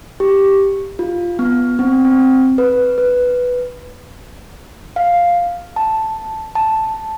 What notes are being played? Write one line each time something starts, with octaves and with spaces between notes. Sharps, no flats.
G4
F4
B3
C4
C4
B4
B4
F5
A5
A5